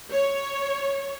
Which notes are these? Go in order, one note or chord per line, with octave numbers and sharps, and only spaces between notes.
C#5